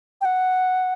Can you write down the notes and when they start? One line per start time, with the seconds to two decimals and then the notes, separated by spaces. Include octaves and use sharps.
0.21 G5
0.25 F#5